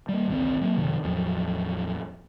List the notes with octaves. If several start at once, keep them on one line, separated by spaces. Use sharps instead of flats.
G3 A#3
G#1 C#2 E3 C4
F#3 A#3
F#1 C3 D#3 F3
A1 E2 F3 F#3